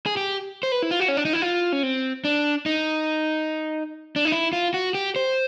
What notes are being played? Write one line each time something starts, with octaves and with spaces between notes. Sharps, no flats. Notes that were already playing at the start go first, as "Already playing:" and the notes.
G#4
G4
C5
B4
E4
F4
F#4
C#4
D4
D#4
E4
F4
C#4
C4
D4
D#4
D4
D#4
E4
F4
F#4
G4
C5